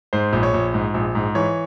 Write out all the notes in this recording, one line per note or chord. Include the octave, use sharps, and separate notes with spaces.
G#2 C5
A#1
C#5
A#1
G#2
A#1
G#2
E3 C#5